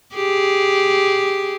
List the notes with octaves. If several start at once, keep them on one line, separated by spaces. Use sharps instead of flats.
G4 G#4